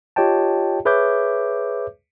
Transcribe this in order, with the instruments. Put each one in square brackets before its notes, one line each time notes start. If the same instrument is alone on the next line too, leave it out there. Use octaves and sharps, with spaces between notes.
[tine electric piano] F4 G4 C#5 D#5 G5 A5
G#4 B4 C#5 E5 D6 G6